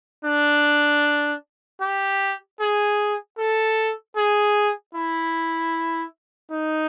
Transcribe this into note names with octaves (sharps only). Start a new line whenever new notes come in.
D4
G4
G#4
A4
G#4
E4
D#4